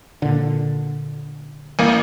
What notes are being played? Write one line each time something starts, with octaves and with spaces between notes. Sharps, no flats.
A#2 D3
A1 A#3